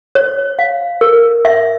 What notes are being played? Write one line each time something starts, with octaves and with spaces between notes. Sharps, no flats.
C#5
F5
A#4
E5